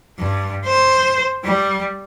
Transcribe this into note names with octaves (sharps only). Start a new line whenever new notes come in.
G2
C5
G3